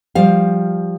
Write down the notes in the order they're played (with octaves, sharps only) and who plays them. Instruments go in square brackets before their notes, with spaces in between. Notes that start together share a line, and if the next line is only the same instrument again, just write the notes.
[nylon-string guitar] F3 G3 F5